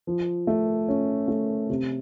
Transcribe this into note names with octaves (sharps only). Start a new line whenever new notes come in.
F3
A3
C#4
A3
C3